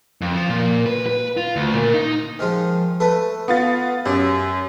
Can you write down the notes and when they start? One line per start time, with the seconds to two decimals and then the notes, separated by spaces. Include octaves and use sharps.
0.21 F2
0.35 F3
0.49 A#2
0.86 B4
1.07 B4
1.37 F4
1.56 D2
1.75 A#2
1.94 D#4
2.39 D#3 F3 G#3
3.00 A3 A4 B4
3.48 B3 F4 A6
4.05 F#2 G4